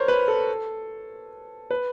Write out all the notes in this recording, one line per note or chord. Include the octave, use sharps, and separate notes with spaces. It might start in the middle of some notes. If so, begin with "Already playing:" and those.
Already playing: A#4 C5 C#5
B4
A4
B4